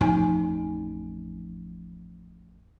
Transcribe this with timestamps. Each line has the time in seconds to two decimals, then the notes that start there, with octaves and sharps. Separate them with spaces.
0.01 A1 F2 F3 D#4 G#5